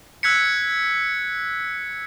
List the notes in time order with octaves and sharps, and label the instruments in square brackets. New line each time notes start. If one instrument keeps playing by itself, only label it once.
[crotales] E6 F#6 G#6 B6 C#7